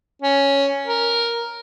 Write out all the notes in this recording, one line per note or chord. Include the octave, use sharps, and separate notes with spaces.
C#4
A#4